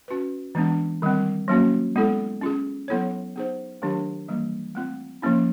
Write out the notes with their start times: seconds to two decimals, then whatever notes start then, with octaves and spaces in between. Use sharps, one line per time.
0.08 C#4 F#4 B4
0.55 E3 G#3 B3 D4
1.02 D#3 G3 C4
1.48 F#3 A#3 C#4 F#4
1.96 G#3 B3 E4 A4
2.41 C#4 F4 G#4
2.88 F#3 B3 E4 A4 C#5
3.36 B3 D#4 G#4 C5
3.82 D#3 F#3 A3 D4 G4
4.28 E3 G3 A#3
4.75 A3 C4 F4
5.22 F3 A#3 C#4 E4